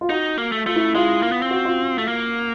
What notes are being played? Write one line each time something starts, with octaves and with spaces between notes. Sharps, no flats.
F4
D#4 F#4
A#3
A3
A3 F4
E4
G#3 F4
A#3
B3
C4
F#4
F4
A3
A#3